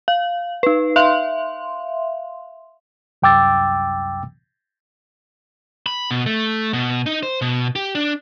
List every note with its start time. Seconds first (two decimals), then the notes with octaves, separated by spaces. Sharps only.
0.08 F5
0.63 D#4 B4
0.96 E5 F5 C6
3.22 C2 F#2 G5 D6 E6 A6
5.86 B5
6.11 B2
6.26 A3
6.73 B2
7.06 D#4
7.23 C5
7.42 B2
7.76 G4
7.95 D4